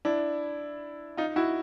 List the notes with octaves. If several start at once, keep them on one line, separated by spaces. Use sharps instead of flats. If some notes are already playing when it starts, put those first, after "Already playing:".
D4 E4
D#4 F4
E4 F#4